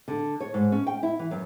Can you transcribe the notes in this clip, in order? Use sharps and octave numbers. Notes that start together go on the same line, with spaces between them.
D3
C#5
G#2
C#4
G5
E4
E3
F#2